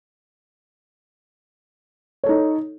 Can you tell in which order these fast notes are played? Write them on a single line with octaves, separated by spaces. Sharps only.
C#5 A4 D#4